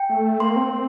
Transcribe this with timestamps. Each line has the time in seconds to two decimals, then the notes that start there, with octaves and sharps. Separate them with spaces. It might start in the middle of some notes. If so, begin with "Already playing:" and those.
Already playing: G5
0.09 A3
0.40 A#3 C6
0.56 C4
0.73 C4